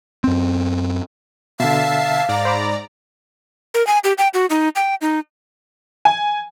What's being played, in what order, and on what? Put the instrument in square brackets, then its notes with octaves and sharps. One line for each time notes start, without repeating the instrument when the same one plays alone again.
[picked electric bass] F#2 C4
[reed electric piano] B2 D3 [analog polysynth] E5 A5 C7 [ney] F5
[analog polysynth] G#2 D5 A#5
[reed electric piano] C5 B5 D6
[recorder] A#4
G#5
G4
G5
F#4
D#4
G5
D#4
[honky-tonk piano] G#5